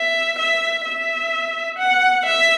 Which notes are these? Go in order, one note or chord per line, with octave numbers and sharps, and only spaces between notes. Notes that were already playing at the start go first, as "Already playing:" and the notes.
Already playing: E5
E5
E5
F#5
E5